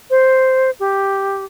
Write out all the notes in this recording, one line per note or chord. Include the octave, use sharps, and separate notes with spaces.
C5
G4